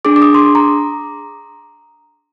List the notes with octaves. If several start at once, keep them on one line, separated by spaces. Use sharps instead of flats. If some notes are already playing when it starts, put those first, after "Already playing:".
D4 G#4 D6
D6
D#6
C6
D6
A#5